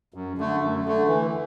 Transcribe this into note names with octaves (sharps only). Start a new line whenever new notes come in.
F#2
D3 A3
F#2
D3 A3
E3